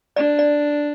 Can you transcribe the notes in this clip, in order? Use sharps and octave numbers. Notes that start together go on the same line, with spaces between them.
D4 D5
D5